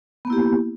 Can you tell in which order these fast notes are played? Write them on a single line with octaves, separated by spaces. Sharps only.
B3 A#3 E4 G4